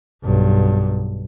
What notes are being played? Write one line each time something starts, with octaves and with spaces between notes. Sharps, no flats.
B1 G2